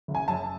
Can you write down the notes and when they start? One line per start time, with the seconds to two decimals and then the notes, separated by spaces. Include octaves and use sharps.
0.08 F#1
0.15 G#5
0.28 F#2 A5